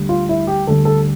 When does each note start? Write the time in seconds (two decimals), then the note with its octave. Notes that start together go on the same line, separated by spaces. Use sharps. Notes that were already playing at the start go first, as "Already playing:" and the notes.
Already playing: D2 D3 G3
0.09 F4
0.29 E4
0.47 G4
0.67 D2 D3 G3 A4
0.85 A4